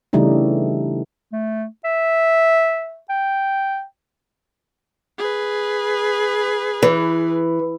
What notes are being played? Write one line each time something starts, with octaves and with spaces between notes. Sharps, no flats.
C#3 E3 G3 A3 D4 D#4
A3
E5
G5
G#4 B4
E3